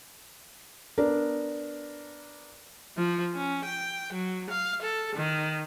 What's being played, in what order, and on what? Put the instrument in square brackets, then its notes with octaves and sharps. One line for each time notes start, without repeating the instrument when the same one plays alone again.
[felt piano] B3 D4 A#4
[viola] F3
C#4
G5
F#3
F5
A4
D#3